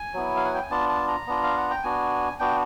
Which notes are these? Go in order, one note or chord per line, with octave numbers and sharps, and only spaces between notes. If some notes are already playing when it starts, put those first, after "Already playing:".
Already playing: G#5
F#3 B3 E4
F5
F#5
G5
G#5
B3 D4 F4 A5
A5
A#5
B3 D4 F4
F5
F#5
G5
B3 D4 F#4 G#5
B3 D4 F#4 G5